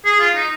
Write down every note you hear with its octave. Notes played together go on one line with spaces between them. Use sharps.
G#4
F4
D#4